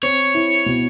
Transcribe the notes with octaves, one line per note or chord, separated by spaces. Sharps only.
C4 C#5
E4
B2